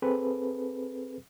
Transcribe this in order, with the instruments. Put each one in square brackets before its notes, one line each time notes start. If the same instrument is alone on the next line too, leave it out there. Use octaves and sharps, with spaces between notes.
[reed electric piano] C4 G#4 A4 B4